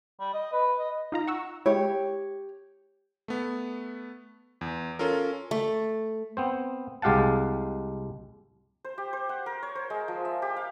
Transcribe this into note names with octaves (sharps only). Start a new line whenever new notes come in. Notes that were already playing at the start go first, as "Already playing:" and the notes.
G3
D#5
B4
D#5
D#4 F4 A#5
F#5 C#6 E6
G#3 E4 G4 C#5
A3 B3
E2
C#4 F4 A4 A#4
A3
B3 C4 C5
C2 G#3 G4 F5 F#5 A5
C5
G4
C5
F#5
A#4
C#5
C5
G#3
F3
E5
G4
F5